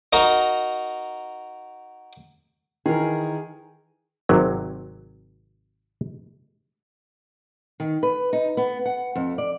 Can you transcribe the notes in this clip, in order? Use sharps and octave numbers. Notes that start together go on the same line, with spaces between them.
D#4 F#4 A#4 A#5
D#3 E3 G#4 A#4
G#1 C3 F#3
D#3
B4
D#4
B3
F#5
F2
D5